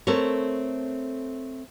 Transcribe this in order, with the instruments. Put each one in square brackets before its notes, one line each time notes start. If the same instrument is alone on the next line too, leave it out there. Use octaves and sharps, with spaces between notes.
[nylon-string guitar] A3 C4 A4 A#4 C#5